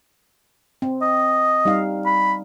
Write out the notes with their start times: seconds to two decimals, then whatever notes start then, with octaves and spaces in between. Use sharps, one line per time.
0.82 C4
1.02 D#5
1.65 G3 D#4 F5
2.06 B5